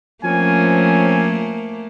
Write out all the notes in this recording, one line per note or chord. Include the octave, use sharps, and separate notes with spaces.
F3 A3 A#3 C4 C#4 G#5